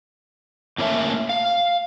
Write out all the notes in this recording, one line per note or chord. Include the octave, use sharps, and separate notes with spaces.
A2 A#3 C#4 A#4 E5 A5
F5